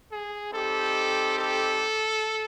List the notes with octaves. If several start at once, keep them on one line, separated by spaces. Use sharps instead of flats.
G#4
G3 C4 D#4 G4 A4
A4